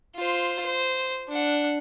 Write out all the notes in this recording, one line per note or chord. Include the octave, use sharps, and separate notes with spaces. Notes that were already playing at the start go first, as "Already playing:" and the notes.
F4 C5
C5
D4 F#5